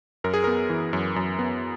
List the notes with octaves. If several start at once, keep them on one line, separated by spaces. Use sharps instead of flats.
F#2 A#4
G#4
B3 A#4
E3
F#2
F#2
B3